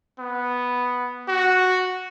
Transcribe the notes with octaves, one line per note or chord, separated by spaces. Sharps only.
B3
F#4